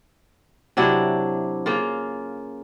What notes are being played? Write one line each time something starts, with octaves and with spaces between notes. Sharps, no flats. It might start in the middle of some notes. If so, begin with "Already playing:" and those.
C3 F#3 D4 E4
C#3 A#3 F4